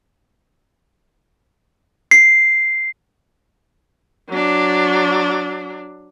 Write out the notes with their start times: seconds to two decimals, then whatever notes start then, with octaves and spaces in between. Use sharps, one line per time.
2.11 C7
4.29 F#3 D4